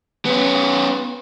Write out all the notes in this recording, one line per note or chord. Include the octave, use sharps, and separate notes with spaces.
B3 C#4